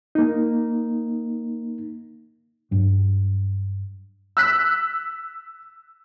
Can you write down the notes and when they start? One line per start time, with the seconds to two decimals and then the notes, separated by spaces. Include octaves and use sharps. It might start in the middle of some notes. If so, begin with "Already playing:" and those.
0.15 A#3 D#4
2.71 G2 F#3
4.37 E6 F#6 B6